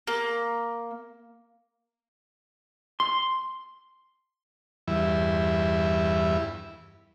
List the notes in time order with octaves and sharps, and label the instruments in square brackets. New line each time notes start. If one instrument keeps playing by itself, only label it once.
[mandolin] A#3
[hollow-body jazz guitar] C6
[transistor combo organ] E2 G2 E4